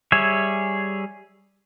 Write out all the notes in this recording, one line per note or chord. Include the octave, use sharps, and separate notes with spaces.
G3 G#4 C#5 E5